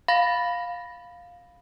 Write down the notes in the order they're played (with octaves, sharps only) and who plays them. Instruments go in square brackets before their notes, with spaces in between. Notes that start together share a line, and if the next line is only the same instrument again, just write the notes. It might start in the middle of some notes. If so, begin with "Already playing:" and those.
[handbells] F5 B5 A6 A#6